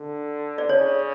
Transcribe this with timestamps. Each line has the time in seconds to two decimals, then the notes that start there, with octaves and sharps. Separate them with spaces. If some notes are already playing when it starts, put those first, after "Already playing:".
Already playing: D3
0.58 D5
0.69 C#3 C#5